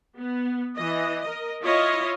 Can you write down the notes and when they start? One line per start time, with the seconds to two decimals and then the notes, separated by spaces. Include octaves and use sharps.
0.18 B3
0.76 E3 D#5
1.22 A#4 D#5
1.62 E4 F4 C#5 D#5 F5